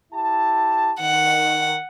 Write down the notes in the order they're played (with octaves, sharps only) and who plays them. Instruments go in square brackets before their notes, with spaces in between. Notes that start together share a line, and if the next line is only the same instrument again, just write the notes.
[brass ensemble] E4 G4 A5
[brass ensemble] D#3 [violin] F#5